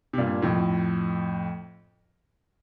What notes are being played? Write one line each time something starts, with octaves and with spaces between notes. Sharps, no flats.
C3
G2 A#2
F2 A2